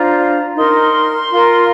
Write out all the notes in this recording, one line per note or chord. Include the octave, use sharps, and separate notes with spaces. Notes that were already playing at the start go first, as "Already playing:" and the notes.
Already playing: D4 F4 C5 A#5
D#4 A#4 C6
F4 A#4